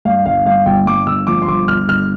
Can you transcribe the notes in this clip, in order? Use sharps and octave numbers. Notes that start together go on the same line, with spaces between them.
G2 F5
G1 F5
G2 F5
G1 G5
G2 D6
G1 E6
F3 D6
C6
G1 D6
G1 F6
G1 F6